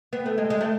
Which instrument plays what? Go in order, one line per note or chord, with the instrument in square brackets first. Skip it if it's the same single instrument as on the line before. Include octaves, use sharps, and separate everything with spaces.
[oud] B3
A3
G#3
G#3
A3